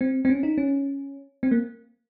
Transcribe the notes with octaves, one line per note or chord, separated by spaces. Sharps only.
C4
C4
C#4
D#4
C#4
C4
A#3